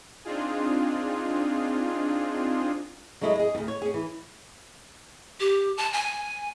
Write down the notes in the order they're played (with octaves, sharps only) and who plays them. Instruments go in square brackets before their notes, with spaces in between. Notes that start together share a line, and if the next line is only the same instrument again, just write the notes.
[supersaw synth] C4 D4 D#4 F4 G#4
[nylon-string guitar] F#3 G#3 E4 A4 D5 D#5
G#4 D#5
D2 G2
C#5
C#4 G#4
E3
[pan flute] G4
A5
G#5